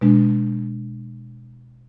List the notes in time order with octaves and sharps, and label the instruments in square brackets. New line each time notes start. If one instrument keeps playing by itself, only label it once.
[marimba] B2 G#3 D4